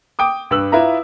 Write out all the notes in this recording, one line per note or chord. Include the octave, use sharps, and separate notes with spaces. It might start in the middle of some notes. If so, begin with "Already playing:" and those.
G5 D6 D#6
G2 B4 E6 F#7
E4 F4 B4 E5 A#5